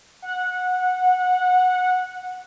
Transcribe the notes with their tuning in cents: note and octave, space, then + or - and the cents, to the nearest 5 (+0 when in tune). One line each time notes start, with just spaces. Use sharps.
F#5 -15